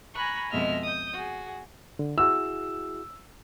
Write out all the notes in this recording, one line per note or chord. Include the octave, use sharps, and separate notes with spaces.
G#5 A#5 B5 C#6 F#6
F2 B2 G#3 D#5 E5 F6
D#6 G6
F#4 G#4
D3
E4 F#4 G#4 E6